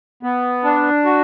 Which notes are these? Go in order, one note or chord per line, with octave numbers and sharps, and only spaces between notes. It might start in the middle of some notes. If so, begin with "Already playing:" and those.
B3
D4
F#4